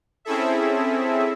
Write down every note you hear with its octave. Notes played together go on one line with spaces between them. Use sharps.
C4 C#4 E4 G#4 A4 E5